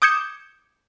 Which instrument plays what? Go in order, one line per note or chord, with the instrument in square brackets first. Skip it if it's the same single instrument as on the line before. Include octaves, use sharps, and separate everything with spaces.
[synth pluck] D6 D#6 G6 G#6 C#7 E7